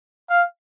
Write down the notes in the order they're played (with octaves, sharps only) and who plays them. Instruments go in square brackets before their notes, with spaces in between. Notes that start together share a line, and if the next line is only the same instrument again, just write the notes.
[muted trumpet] F5